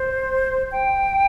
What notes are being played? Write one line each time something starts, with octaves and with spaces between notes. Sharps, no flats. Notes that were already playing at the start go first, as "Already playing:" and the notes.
Already playing: C5
G5